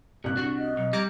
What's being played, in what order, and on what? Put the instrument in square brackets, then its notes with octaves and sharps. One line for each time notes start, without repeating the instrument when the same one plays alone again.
[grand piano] C2 F#6 [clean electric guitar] G2 [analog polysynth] A#2
[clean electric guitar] D4 [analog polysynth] F#4
[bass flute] D#5
[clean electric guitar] B1
[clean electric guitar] G3 [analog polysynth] A#5 D6 G#6